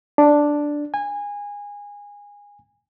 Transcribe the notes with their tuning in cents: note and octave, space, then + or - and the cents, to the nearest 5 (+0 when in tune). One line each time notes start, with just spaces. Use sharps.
D4 +0
G#5 -20